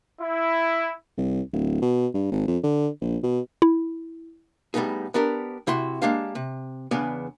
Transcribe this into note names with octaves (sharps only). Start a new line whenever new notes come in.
E4
C2
D1
B2
G2
G#1
F2
D3
A#1
B2
E4
A2 G3 A3 B3 D#4 G#4
B3 D4 G4 A#4
C3 E4 F#4 C6
G#3 A#3 D4 G4 F5
C3
E2 C#3 B3 D4 D5 G#5